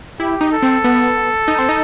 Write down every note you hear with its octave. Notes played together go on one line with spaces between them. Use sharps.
E4 G4
D#4
A4
C4
B3
D#4
C4
D#4